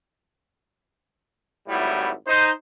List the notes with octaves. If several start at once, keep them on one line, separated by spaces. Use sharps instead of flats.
G#1 A2 G3 E4 F#4
D#4 C5